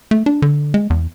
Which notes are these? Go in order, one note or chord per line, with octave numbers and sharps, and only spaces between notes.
A3
D4
D3
G#3
E2